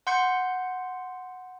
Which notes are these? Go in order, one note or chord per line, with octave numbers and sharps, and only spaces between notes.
F#5 C6 G6 C#7